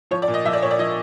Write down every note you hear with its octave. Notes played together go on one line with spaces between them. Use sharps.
F3 C#5
D5
A#2
D#5
F3 E5
D5
A#2 C#5
D5
F3 D#5